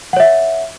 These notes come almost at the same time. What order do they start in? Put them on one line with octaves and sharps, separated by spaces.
F#5 C#5 E5